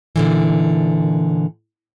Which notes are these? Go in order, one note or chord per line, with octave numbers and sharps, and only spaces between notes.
A#2 D3 E3